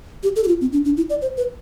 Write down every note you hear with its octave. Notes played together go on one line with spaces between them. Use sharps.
G4
A4
G4
F4
C4
D4
D4
E4
D5
C5
B4